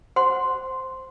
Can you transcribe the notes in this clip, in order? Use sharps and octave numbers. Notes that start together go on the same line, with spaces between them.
C5 F#5 C6